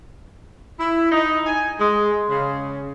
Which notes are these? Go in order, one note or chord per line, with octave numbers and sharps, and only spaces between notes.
E4
D#4
G#5
G#3
C#3